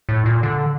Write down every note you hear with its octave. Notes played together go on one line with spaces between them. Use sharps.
A2
A#2
D3